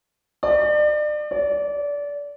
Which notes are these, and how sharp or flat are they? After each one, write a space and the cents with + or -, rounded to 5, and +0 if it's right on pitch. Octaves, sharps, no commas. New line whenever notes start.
D5 +35
D5 -25